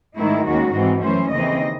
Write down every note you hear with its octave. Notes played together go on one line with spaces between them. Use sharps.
G#2 D#3 A3 E4
D#2 D#3 G#3 C#4 F#4
G#2 E3 G#3 C4
F#2 E3 A3 C#4 C5
D#2 C#3 E3 C4 D#5